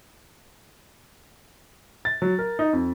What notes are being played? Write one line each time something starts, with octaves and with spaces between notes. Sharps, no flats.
A6
F#3
A#4
D#4
F2